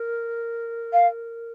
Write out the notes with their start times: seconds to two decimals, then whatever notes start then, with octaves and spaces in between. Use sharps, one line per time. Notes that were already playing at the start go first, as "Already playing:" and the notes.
Already playing: A#4
0.93 F5